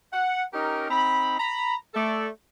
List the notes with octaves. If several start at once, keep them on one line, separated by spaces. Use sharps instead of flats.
F#5
C#4 D#4 G4 A#4
C4 D#4 A#5 B5
A#5 B5
A3 A4 D5